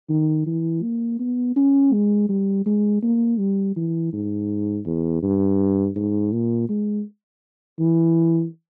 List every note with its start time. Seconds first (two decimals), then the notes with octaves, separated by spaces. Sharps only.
0.09 D#3
0.46 E3
0.83 A#3
1.19 B3
1.56 C#4
1.92 G#3
2.29 G3
2.66 G#3
3.03 A#3
3.39 G3
3.76 E3
4.13 G#2
4.86 E2
5.23 G2
5.96 G#2
6.32 A#2
6.69 G#3
7.79 E3